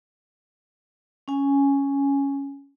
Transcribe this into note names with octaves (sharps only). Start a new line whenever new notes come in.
C#4 G#5